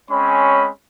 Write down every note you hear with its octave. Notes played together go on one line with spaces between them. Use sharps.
G#3 C4 C#4 C#5 B5